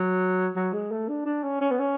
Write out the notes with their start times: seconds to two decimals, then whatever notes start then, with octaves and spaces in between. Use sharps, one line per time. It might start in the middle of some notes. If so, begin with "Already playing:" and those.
Already playing: F#3
0.56 F#3
0.73 G#3
0.91 A3
1.08 D4
1.26 D4
1.43 C#4
1.61 C#4
1.71 B3
1.79 C#4